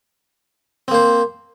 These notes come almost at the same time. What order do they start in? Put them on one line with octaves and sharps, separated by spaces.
C4 A#3 C5